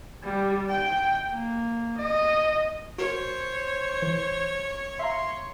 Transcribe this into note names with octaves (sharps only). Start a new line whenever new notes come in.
G3
G5
A#3
D#5
F#4 A#4 C5 C#5
E3
E5 F5 A#5 C6